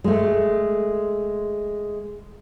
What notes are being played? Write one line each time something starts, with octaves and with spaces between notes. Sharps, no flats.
G#3 A3